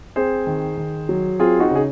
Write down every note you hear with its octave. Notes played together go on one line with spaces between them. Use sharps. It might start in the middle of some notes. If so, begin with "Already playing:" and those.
C4 G#4 C5
D#3
D#3
F#3
C4 F4 G#4
D#4 F#4
C#3 G#4